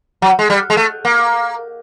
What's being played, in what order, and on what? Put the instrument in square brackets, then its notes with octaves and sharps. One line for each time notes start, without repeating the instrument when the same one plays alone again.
[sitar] F#3
G#3
G3
G#3
A3
A#3